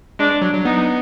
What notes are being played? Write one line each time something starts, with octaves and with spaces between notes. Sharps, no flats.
G#3 D4
F#3
F#3
B3 D#4